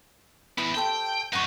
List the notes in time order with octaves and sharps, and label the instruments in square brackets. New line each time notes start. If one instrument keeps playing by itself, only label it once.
[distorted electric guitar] E3 B3 [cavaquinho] E4
[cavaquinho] G4 A4 C5 [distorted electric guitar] G5
[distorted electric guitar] F#2 D#4 [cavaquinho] F#5 C#6